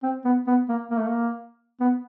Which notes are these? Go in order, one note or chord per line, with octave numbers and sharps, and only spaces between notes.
C4
B3
B3
A#3
A#3
A3
A#3
B3